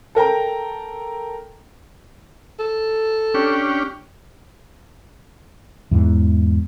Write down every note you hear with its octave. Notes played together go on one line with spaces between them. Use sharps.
A4 A#4 G5 A#5
A4
C#4 D4 G4
E2 G#2 E3